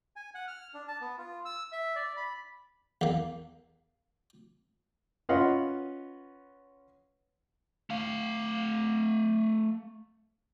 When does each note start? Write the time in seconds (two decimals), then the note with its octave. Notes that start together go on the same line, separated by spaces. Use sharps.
0.16 G#5
0.34 F#5
0.48 F6
0.74 D4
0.88 A5
1.01 B3
1.18 F4
1.45 E6
1.72 E5
1.96 D5
2.17 B5
3.01 E2 A#3
5.29 C#4 F4 B4 D#5 F5 F#5
7.90 A3 F5